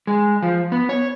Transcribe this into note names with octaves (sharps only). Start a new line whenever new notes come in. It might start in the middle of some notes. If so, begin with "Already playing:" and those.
G#3
F3
B3
C#5